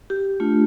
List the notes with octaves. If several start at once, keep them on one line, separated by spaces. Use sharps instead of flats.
G4
A3 D4 F4